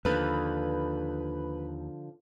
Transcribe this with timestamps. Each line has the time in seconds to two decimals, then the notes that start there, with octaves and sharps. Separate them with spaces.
0.05 D#2 D3 F3 B4 B5